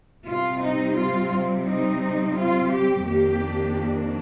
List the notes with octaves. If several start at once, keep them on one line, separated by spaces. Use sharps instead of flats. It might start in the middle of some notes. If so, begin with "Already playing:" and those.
C3 G3 C4 F4
D#4
F4
D#4
F4
G4
F2 D#3 A#3 D4 G4